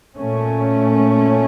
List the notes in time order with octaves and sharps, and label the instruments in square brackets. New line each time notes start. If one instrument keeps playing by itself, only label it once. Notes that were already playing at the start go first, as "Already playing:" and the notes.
[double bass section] A#2 A3 C#4